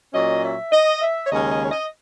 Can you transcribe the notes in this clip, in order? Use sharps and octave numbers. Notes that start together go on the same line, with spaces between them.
A#2 F#3 C#4 D#5
E5
D#5
E5
C#5
D#2 C#3 G#3 C#4 D#5
D#5
C#5
D#5